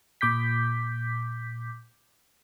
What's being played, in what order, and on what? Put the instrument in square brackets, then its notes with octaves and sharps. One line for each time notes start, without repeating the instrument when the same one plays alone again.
[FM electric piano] A#2 D6 G6 B6